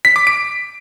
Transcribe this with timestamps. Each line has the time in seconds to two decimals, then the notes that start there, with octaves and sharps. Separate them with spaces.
0.05 B6
0.16 D6
0.27 D7